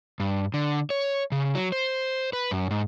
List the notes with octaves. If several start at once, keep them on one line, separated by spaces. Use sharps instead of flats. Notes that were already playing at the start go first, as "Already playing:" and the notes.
G2
D3
C#5
C#3
F#3
C5
B4
F#2
G#2